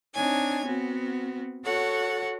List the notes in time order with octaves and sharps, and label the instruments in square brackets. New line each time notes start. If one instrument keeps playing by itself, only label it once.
[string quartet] C4 D4 D#4 C#5 G#5
B3 C4 F#4
F#4 A4 C#5 F#5